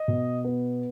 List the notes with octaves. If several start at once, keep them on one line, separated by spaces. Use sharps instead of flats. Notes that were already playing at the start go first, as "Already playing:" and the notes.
Already playing: D#5
B2
B3